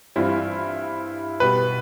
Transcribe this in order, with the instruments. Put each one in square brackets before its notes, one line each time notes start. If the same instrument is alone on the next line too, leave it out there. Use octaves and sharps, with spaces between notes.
[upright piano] G2 E3 G3 C4 F4 [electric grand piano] E4
[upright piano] B2 G3 B3 E4 G4 [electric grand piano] B4